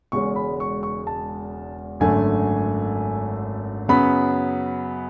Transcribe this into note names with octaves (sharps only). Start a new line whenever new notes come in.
E1 E2 C#3 G#3 C#4 C#6
B5
C#6
C#6
A5
G#1 F#2 D3 A3 G#5
F#2 C#3 F#3 B3 B5